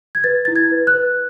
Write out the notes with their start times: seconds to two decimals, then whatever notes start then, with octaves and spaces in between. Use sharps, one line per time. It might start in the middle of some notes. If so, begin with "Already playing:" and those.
0.15 G#6
0.24 B4 A6
0.45 E4 A6
0.56 G#6
0.71 B4
0.87 F#6
0.94 B4